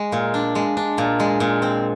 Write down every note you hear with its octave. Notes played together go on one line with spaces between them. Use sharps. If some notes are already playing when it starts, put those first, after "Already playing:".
Already playing: G#3
A#2
D4
G#3
D4
A#2
G#3
A#2
C4